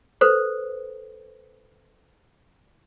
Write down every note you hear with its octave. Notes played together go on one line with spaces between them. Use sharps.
A4 B4 C5